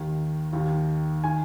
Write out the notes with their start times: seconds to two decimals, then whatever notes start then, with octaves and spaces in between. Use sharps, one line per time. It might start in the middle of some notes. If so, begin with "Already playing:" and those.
Already playing: D#2 D#3
0.53 D#2 D#3
1.24 D#3 G#5